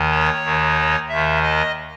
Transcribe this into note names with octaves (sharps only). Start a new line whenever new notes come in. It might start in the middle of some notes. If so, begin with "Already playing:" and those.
Already playing: D#2 D#3
C#5
D#2 D#3
D#2 D#3 E5
D#5